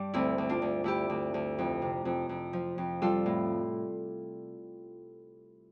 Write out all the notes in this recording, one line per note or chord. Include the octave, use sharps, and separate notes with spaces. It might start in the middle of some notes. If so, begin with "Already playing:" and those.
Already playing: G2 G3 D4
D2 C4 E4
D2
D4 F4
D2
D2 E4 G4
D2
D2
F2
C3
F2
F2
F3
F2
G3 F4 A4
A2